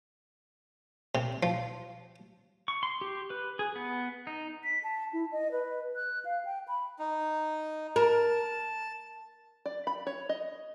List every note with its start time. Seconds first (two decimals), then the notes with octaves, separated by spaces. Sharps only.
1.15 C3
1.43 F3
2.68 C#6
2.83 C6
3.01 G4
3.30 B4
3.59 G#4
3.76 B3
4.27 D#4
4.64 B6
4.83 A5
5.13 E4
5.32 D#5
5.52 B4
5.96 F#6
6.25 F5
6.45 G5
6.68 B5
6.99 D#4
7.96 A#4 A5
9.66 D5
9.87 B5
10.07 C#5
10.29 D#5